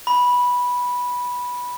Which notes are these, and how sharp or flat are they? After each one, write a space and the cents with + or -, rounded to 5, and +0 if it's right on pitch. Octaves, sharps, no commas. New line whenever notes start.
B5 -10